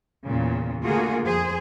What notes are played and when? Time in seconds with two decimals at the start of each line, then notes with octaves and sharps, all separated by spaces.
0.24 E2 A#2 C#3
0.83 D3 A3 A#3 F4 F#4 G#4
1.24 F2 G#4 C5